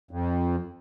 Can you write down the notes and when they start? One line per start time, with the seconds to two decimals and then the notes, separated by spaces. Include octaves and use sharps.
0.11 F2